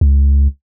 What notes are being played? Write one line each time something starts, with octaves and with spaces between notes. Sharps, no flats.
C#2